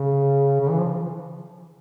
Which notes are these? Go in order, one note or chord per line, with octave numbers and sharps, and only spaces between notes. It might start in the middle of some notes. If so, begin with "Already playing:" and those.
Already playing: C#3
C#3
E3
F3